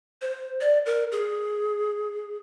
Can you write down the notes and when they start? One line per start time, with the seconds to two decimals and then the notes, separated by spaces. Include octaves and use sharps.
0.22 C5
0.61 D5
0.86 A#4
1.12 G#4